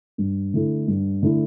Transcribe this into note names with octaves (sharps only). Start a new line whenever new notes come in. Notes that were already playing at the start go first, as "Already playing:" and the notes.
G2
D3 A3 E4
G2
D3 A3 E4